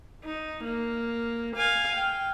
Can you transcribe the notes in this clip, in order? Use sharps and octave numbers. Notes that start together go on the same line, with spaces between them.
D#4
A#3
F5 G#5
G5